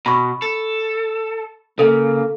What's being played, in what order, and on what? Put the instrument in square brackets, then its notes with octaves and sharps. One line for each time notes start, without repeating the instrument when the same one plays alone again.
[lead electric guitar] B2 [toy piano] B5 C#6
[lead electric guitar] A4
[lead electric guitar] C#3 [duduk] A#3 [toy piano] A4 F5